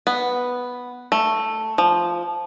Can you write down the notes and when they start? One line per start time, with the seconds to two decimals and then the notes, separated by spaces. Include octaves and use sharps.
0.07 B3
1.12 A3
1.78 F3